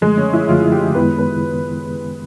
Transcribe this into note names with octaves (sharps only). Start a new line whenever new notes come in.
F#2 D3 F3 G#3 A3
C#4
E4
F#2 D3 F3 A3 F4
G4
F#2 D#3 G#3 B3 E4 B4
B4